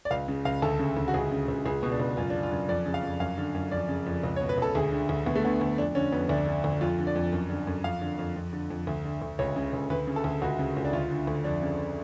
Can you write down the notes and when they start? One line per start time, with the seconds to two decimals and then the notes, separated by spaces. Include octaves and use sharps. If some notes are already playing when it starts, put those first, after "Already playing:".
0.05 D5
0.11 C#2 F5
0.28 C#3
0.45 C#2 F5
0.62 D2 A4
0.79 C#3
0.97 D2
1.08 F#4
1.14 C#2 G#4
1.31 C#3
1.48 C#2
1.66 C#2 G#4
1.83 B2
1.92 D4
2.00 C#2
2.17 F#2 F4
2.30 D3 D4
2.43 F4
2.51 F#2
2.69 F2 D5
2.86 C#3
2.94 F5
3.03 F2
3.20 F#2 F5
3.38 D3
3.55 F#2
3.71 F2 D5
3.89 C#3
4.06 F2
4.23 C#2
4.36 B2 C#5
4.49 B4
4.58 C#2 A4
4.75 D2 G#4
4.92 D3
5.09 D2
5.26 D2 B3
5.36 A3
5.44 D3 B3
5.61 D2
5.78 F2 D4
5.95 D3 C#4
6.12 F2 B3
6.29 D2 D4
6.47 D3
6.64 D2
6.81 F2 F4
6.99 D3
7.07 D5
7.15 F2
7.33 F#2
7.50 D3
7.67 F#2
7.84 F2 F5
8.01 D3
8.18 F2
8.36 F2
8.53 D3
8.70 F2
8.87 D2
9.05 D3
9.22 D2
9.39 C#2 C#5
9.56 C#3
9.73 C#2
9.90 D2 B4
10.07 C#3
10.16 A4
10.24 D2
10.42 C#2 F#4
10.59 C#3
10.77 C#2
10.84 D4
10.93 D2 F4
11.11 D3
11.27 D2
11.44 F2 D4
11.62 C#3